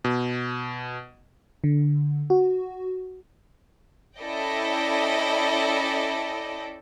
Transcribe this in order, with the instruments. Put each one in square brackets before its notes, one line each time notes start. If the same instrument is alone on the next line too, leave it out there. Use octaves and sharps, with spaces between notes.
[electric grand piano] B2
[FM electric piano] D3
F#4
[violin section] C#4 E4 A4 D5 D#5 G5